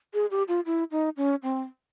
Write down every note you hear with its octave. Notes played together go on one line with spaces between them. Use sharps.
G#4
G4
F4
E4
D#4
C#4
C4